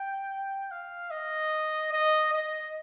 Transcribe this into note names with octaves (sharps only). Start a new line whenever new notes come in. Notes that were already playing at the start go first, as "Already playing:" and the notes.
Already playing: G5
F5
D#5
D#5
D#5